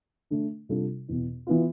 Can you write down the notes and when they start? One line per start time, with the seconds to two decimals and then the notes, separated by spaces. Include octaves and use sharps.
0.30 D3 A3 D4
0.69 C3 G3 D4 F4 A4
1.08 E2 B2 B3
1.47 E3 B3 F4